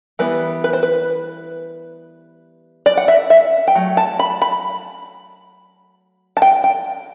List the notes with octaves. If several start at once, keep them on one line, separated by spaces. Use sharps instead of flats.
E3 G3 B3 B4
B4
C5
B4
D5
F#5
E5
E5
G5
F#3 A3
A5
B5
B5
A5
G5
G5